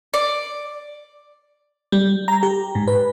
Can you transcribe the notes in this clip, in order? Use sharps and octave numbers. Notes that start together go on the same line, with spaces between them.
D5
G3
A#5
G4
G#2
B4